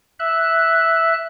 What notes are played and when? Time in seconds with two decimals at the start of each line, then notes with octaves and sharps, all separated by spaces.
0.19 E5 F#6